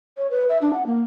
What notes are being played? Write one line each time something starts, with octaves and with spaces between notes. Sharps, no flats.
C#5
B4
E5
D4
F#5
A#3